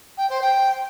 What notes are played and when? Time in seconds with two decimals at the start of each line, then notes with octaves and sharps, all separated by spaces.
0.17 G5
0.29 C5
0.41 G5